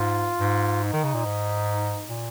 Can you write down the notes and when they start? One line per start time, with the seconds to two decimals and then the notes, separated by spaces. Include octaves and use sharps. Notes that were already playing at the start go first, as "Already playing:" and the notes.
Already playing: G#2 F4
0.40 G#2
0.83 D#4
0.93 D#3
1.04 C#3
1.14 A#2
1.25 G#2
2.09 A#2